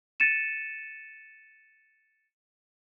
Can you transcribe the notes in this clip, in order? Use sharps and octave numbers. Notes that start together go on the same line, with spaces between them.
A6 C#7 D#7 E7